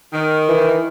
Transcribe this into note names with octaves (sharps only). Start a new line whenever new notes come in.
D#3
E3